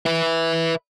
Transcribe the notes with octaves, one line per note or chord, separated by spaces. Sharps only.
B4 E5